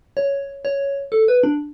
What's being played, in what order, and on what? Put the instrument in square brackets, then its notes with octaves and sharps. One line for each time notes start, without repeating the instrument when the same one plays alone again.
[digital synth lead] C#5
C#5
A4
B4
D4